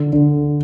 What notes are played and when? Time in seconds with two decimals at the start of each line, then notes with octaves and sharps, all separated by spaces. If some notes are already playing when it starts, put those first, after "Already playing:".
Already playing: D3
0.13 D3